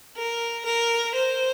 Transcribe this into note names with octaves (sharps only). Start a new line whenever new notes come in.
A#4
A#4
C5